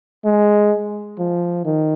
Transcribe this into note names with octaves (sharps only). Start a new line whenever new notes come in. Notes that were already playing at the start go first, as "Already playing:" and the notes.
G#3
F3
D#3